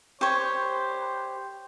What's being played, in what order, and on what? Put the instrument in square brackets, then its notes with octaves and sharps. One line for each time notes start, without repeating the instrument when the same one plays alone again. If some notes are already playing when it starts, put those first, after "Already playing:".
[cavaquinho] G4 C#5 [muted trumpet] C5